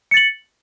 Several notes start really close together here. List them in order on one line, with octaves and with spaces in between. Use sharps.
C#7 A6 F#7